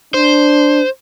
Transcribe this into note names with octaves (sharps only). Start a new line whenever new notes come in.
D4 C5